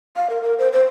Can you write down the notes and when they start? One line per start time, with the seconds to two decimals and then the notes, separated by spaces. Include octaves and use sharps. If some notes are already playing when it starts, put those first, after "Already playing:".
0.16 F5
0.30 A#4
0.42 A#4
0.59 C5
0.73 C5